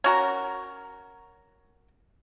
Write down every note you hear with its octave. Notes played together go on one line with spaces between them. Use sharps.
C#4 F#4 A#4